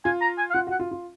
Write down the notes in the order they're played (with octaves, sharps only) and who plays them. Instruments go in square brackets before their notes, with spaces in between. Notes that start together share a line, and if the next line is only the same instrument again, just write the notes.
[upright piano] F4 [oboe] G#5
[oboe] A#5
G#5
F5
[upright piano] F4 [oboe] F#5
[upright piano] F#4 [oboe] F#5
[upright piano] F4
F4